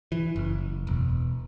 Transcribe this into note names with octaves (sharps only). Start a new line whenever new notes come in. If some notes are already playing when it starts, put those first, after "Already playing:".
E3
F#1
E1